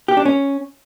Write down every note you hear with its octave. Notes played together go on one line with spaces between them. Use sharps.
G4
D4
C#4